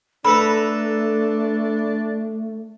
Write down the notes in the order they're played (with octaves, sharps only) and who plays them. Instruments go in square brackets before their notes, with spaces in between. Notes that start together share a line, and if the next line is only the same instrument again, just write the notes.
[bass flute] A3 [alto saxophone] D4 [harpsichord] A4 B4 A#5 [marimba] B5